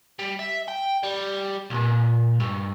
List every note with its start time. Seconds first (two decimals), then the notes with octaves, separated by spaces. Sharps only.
0.19 G3
0.39 E5
0.68 G5
1.03 G3
1.70 B1 A#2
2.40 G2